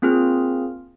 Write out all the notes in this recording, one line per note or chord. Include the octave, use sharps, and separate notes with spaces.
A#3 C4 F4 G#4 F6